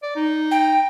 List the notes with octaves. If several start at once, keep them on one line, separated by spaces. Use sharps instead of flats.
D5
D#4
G5